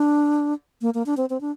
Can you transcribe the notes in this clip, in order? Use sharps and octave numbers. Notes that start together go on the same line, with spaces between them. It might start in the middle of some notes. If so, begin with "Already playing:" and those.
Already playing: D4
A#3
A#3
D4
C4
C4
D4